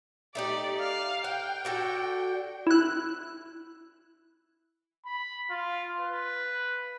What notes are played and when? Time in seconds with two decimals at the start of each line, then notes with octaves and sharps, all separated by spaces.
0.35 A3 D#4 G4 D5
0.80 F5
1.24 F#5 G5
1.65 D4 F#4 A4
2.67 E4 F#6
5.05 B5
5.50 F4
6.00 B4